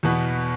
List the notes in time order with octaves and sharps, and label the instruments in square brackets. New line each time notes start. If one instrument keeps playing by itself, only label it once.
[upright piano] E2 B2 B3